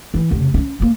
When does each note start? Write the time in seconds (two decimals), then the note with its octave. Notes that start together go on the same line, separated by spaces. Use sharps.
0.14 E3 E4
0.31 F1 C#3
0.54 C#4 D4
0.80 A3 A#3